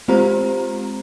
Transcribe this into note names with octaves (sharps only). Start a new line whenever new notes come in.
G#3 C4 F4 G4 C5 A#5